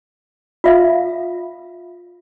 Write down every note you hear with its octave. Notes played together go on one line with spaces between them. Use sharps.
F4 E5 F5